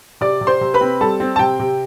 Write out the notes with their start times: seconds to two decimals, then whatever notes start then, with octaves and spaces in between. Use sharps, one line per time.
0.21 C3 D5 D6
0.41 C3
0.47 C5 C6
0.61 C3
0.74 B4 B5
0.81 C4
1.01 G3 A4 A5
1.20 C4
1.36 A5
1.39 C3 G5
1.59 C3